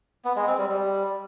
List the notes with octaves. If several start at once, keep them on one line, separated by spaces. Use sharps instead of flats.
B3
G#3
C4
G3
G3